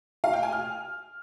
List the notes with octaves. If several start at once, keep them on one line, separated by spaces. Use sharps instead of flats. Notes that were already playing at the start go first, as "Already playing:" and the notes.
F5
G5
G#5
F6